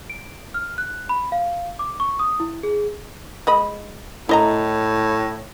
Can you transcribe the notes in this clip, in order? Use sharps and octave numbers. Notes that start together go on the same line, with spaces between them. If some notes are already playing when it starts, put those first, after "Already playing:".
D7
F6
F#6
B5
F5
D6
C#6
D#6
E4
G#4
G#3 D#5 B5
A2 E4 D#5 A#5